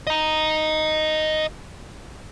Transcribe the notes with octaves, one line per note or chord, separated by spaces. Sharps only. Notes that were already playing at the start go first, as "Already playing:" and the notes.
D#5 A#5